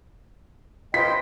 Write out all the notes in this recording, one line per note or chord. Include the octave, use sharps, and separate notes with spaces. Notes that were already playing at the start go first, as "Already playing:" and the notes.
F4 B4 C5 D#5 G5 B6